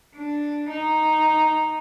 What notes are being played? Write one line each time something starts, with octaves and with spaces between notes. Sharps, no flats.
D4
D#4